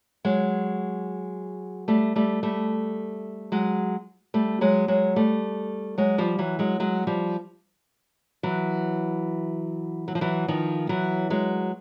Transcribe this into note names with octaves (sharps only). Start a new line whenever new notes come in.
F#3 G#3
G3 A3
G3 A3
G3 A3
F#3 G#3
G3 A3
F#3 G#3
F#3 G#3
G3 A3
F#3 G#3
F3 G3
E3 F#3
F#3 G#3
F#3 G#3
F3 G3
E3 F#3
F#3
F3
E3 F#3
D#3 F3
E3 F#3
F#3 G#3